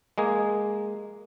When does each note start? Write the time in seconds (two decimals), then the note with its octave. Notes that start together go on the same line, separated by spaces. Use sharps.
0.18 G#3 A#3 G#4